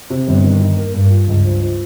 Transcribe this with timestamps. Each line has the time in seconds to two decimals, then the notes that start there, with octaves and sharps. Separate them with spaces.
0.10 C3
0.27 G1 G2
0.44 D#3
0.61 D#3
0.77 A#3
0.94 G2 A#3
1.10 F4
1.27 C#2 G2
1.45 F3
1.62 F3